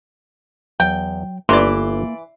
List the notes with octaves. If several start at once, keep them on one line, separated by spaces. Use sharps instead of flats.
E2 F#3 G5
G1 E3 A#3 E4 D5 E5 A#5 C6